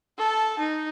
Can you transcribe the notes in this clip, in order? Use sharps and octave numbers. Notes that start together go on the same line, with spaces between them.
A4 A5
D#4